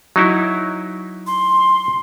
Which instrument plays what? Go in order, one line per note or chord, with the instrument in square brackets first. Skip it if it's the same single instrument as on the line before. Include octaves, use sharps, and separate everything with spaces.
[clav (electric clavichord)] F#3 D#4 E4
[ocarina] C6